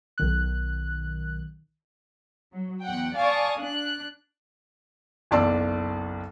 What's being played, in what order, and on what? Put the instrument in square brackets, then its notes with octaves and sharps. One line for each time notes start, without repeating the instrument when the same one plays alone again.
[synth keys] B1 D#3 F#6
[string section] F#3
E2 F#5 G5
D5 F5 G#5 A5 C#6 D#6
D4 F#6
[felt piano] F#1 B1 D5 A5 C6 E6